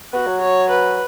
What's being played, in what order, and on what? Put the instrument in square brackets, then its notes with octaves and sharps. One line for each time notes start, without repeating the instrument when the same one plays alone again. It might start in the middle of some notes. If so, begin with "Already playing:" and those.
[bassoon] B3 [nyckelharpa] F#4
[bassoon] F#3
[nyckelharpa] C#5
B4